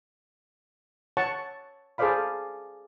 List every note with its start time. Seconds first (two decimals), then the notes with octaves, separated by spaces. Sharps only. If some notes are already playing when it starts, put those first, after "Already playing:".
1.17 C#5 F#5 A5 C#6
1.98 G#4 A4 C5 D5 F5 B5